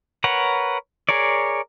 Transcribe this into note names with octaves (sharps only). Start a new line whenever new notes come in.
A#4 B4 C#5 F#5
G#4 A#4 C#5 D5